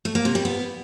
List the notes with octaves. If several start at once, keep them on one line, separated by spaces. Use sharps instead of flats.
A3
A#3
C3
G3
B3